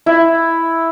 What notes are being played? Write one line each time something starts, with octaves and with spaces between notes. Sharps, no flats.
E4